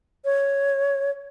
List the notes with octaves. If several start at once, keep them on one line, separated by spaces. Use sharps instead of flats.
C#5